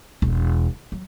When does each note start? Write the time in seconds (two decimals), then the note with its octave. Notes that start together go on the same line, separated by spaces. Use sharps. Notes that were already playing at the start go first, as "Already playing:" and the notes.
0.22 E1
0.92 F#3